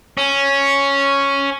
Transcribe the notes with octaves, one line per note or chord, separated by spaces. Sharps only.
C#4